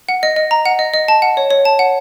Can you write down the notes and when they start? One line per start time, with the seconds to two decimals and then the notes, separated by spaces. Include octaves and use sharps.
0.09 F#5
0.23 D#5
0.36 D#5
0.51 A#5
0.66 F#5
0.79 D#5
0.93 D#5
1.08 A5
1.22 F#5
1.37 C#5
1.51 C#5
1.65 A5
1.79 F#5